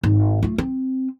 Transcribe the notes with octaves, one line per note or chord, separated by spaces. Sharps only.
G#1
A3 F4
C4